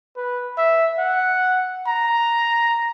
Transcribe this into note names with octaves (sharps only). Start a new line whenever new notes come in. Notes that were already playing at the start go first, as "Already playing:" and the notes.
B4
E5
F#5
A#5